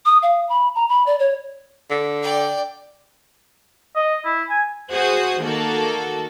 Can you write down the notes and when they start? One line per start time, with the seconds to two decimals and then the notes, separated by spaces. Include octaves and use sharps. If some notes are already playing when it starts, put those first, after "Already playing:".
0.05 D#6
0.23 F5
0.49 B5
0.75 A#5
0.89 B5
1.06 D5
1.19 C#5
1.90 D3
2.23 D5 G5
3.96 D#5
4.25 E4
4.49 G#5
4.92 F#4 G#4 C5 D#6
5.41 D#3 A#3 F#4 A4